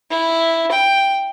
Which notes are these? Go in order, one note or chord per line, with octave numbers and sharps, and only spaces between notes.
E4
G5